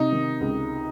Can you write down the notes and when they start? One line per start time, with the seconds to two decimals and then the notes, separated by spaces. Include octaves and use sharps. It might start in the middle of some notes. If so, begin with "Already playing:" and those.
Already playing: C3 D#4
0.12 D#3
0.41 C#2